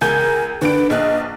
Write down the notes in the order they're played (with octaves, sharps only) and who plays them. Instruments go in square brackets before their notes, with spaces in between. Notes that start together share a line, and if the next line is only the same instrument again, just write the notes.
[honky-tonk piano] C#2 G#5 G6 [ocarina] A#4
[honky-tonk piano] D3 D4 D7 [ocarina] B4
[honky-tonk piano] A#1 F#6 [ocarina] D#5